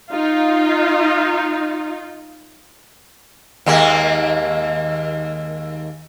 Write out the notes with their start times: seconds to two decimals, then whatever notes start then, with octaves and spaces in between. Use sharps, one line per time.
0.11 D#4 F4
3.66 D#2 G#3 A#3